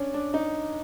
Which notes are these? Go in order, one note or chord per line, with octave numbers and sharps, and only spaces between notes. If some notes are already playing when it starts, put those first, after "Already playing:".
Already playing: C#4 D4
D4
D#4